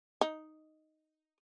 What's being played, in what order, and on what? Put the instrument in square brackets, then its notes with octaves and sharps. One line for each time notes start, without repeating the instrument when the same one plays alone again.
[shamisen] D#4